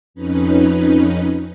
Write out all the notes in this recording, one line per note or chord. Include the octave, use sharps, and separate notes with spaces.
F2 C#4 D#4 B4